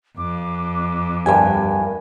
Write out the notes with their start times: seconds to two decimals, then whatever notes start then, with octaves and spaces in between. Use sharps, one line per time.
0.18 F2 D6
1.26 D2 G2 G4 A#4 G#5